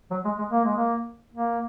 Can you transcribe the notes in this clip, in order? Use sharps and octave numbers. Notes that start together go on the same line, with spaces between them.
F#3
G#3
G#3
A#3
G#3
A#3
A#3